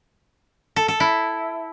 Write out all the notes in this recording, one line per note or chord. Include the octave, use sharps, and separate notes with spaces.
A4
A4
E4